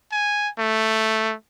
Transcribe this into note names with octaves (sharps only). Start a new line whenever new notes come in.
G#5
A3